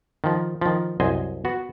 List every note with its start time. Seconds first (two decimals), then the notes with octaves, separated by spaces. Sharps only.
0.24 D#3 F3
0.61 D#3 F3
1.00 C2 F#2 C5 D#5 G#5
1.45 B3 F#4